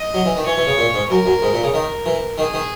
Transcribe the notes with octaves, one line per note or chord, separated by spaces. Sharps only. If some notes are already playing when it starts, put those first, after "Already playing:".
Already playing: D#5
F#3
E3
D#3
E3 C#5
E3
C#3
A#2
G#2
F#2 A#4
F#2
G#2
A#2
C#3
D#3 A#4
E3
D#3 G#4
D#3